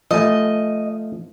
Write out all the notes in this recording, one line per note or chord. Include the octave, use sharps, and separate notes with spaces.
F3 A3 D#5 G#5